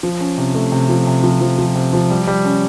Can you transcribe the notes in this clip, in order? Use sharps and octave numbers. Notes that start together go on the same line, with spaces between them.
F3
C#4
C3
A3
C3
F3
C3
F3
F3
F3
C3
F3
G3
G3
C#4